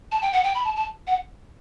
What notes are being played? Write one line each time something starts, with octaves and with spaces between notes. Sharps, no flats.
A5
G5
F#5
G5
B5
A5
A5
F#5